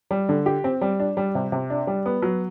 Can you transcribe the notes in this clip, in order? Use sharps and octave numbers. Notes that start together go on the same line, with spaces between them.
G3
D3
G4
C4
G3
D4
G3
C3
C3
D4
G3
B3
F#3